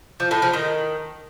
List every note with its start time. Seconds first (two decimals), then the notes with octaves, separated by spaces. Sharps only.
0.20 F3
0.31 A2
0.42 F3
0.53 D#3